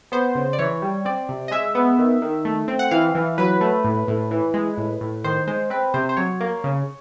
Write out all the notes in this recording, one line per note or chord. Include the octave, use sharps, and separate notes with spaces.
B3 C5
C#3
D5
E3 C#5
G3
C4 D5
C3
D#5
G#3 E5
B3
D#3
D#3
A3
C4
F#5
E3 F5
E3
F#3 B4
A3
A2
A2
E3
G#3
A2
A2
D#3 C5
G#3 C5
C4 B4
C3 C5
C5
F#3 C#5
A#3
C#3